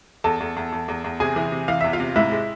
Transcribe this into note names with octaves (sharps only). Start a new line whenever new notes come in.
E2 A4 A5
E2
E2
E2
E2
E2
C3 G#4 G#5
E3
C3
E3 F5
E2 E5
F4 F5
C3
G#2 E4 E5
G#3